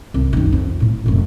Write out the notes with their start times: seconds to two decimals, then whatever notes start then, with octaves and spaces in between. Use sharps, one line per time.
0.14 C2
0.33 F#2 D#3
0.52 F2
0.80 A2 E4
1.06 F1 F#2